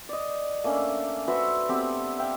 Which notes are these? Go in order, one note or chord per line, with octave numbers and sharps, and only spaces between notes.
D5 D#5
A3 A#3 C#4 D4
F#4 B4 C5 E5
B3 C4 G4 A4
E5 F5 G5